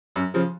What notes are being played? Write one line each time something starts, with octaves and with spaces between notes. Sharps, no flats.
F#2
C#3 F3